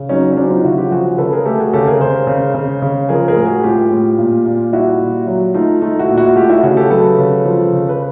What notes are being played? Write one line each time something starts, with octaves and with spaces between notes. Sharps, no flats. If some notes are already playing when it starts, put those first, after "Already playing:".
Already playing: C#3
F#3 C#4 D#4
C#4
F#3 C4 D4
D#4 F4
C#3 E4 F#4
F4 G4
F3 F#4 G#4
C#3 A4 B4
G#4 A#4
A3 G4 A4
F#4 G#4
C#3 G4 A4
G#4 A#4
C#3 A#4 C5
C#3
C#3
C#3
F3 G#4 A#4
G#4 A#4
A2
F#4 G#4
A2 F4 G4
A2
A#2
A#2
G3 E4 F#4
A#2
F#3
A3 D#4 F4
A3 D#4 F4
E4 F#4
A#2
E4 F#4
A3 F4 G4
E4 F#4
C#3 F#4 G#4
G4 A4
F#3 A4 B4
C#3
F3
C#3
B4